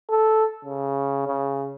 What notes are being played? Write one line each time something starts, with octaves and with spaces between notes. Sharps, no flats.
A4
C#3
C#3